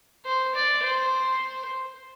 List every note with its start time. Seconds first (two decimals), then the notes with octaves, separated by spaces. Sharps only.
0.26 C5
0.55 D5
0.84 C5